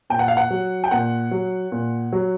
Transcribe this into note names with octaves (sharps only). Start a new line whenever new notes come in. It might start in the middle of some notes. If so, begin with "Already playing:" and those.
A#2 G5
F#5
F5
F#5
F#3
G5
A#2 F#5
F#3
A#2
F#3